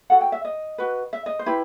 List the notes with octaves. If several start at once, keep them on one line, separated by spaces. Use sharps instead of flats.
F#4 A4 F#5
G5
E5
D#5
F#4 B4
E5
D#5
C5
E4 G4 B4